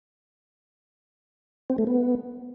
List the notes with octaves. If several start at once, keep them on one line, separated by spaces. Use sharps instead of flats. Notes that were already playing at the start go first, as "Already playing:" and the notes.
C4
A3
B3